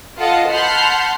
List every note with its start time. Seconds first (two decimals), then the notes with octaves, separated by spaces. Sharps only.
0.18 F4 A4 D#5 F#5
0.48 F#5 A5 B5 C6 F6 G6